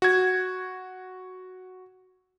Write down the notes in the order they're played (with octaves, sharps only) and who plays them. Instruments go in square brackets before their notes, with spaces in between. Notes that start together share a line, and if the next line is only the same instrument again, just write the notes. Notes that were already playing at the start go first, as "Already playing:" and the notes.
[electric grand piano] F#4 G#6